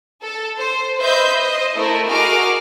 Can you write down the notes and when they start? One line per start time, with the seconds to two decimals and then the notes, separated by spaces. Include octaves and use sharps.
0.22 A4
0.57 C5
0.99 B4 C5 D#5 E5 G6
1.38 C5 D#5
1.74 A3 E4 A#4
2.07 F#4 G#4 A#4 D#5 D6 F6